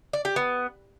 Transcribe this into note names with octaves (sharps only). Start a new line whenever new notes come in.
D5
G4
B3